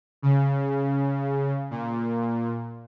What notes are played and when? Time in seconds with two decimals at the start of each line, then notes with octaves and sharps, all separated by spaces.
0.22 C#3
1.71 A#2